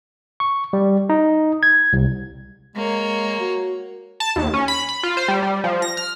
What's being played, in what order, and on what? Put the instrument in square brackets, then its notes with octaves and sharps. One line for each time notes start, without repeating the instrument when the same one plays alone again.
[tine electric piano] C#6
G3
D#4
G#6
C2
[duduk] G#3 [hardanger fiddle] A#3 C#5
[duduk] F#4
[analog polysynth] A5
D#2
C#4
B5
B5
F4
C5
G3
G3
F3
A#6
F6